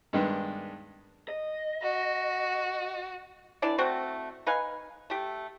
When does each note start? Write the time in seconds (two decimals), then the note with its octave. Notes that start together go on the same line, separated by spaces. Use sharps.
0.13 G2 D#3 G#3 B3 D4
1.28 D#5
1.82 F#4
3.62 E3 D4 E4 D5
3.78 A3 C4 F#4
4.46 D#4 B4 F5 G#5
5.10 A3 G4